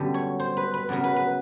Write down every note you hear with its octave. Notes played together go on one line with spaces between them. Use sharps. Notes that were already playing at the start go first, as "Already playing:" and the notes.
Already playing: F#2 D3 G3 B3
C#5
C5
B4
B4
F#2 C#3 F#3 B3 D#4 A#4
B4
B4